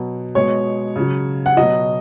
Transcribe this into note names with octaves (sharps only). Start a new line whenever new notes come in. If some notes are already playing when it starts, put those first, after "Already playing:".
Already playing: B2 F#3
B2 G#3 C#5
C#3 F#3
F#5
B2 F#3 D#5